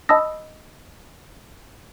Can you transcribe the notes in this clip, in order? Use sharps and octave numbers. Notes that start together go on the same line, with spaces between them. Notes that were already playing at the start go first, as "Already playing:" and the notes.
D#5 A5 B5 D#6 E6 A#6